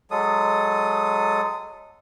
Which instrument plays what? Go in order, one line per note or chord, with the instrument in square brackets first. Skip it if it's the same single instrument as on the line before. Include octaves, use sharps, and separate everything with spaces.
[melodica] F#3 G#3 A4 D#6